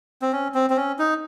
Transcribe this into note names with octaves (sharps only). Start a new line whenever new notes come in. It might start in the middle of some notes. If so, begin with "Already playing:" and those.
C4
C#4
C4
C4
C#4
D#4